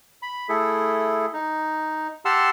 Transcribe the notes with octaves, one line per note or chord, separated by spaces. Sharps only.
B5
A3 E4 G#4 A4
D#4
G4 F#5 A5 C6 E6 F6